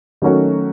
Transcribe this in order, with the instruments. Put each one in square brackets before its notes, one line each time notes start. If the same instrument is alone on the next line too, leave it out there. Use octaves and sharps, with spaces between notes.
[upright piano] D#3 F#3 A3 C#4 F#4